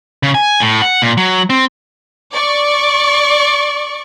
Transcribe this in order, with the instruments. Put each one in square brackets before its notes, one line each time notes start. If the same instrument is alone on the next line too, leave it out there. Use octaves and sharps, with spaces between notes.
[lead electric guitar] C#3
G#5
A2
F#5
A#2
F#3
C4
[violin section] D5 C#6